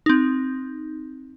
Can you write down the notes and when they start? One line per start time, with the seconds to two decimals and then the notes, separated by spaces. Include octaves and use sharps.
0.06 C4 D#4